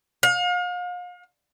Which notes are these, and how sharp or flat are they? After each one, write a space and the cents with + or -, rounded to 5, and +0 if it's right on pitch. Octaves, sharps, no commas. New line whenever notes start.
F5 +40